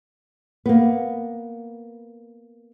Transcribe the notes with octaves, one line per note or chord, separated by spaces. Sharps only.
A#3 B3